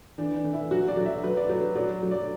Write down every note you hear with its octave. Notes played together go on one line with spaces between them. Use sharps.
E3 D4
D4
E3
E4
F#3 F#4
D5
F#3
E5
F#3 B4
D5
F#3 B4
F#3 D5
F#3
D5